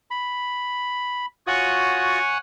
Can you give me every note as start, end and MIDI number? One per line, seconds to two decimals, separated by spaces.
0.11 1.26 83
1.47 2.19 65
1.47 2.19 66
1.47 2.37 73
1.47 2.37 78
1.47 2.37 80
1.47 2.19 87